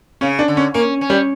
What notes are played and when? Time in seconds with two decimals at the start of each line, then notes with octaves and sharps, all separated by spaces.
0.21 C#3 C#4
0.39 D4
0.48 D3
0.57 C#4
0.74 A#3 C#4
1.01 C#4
1.10 G3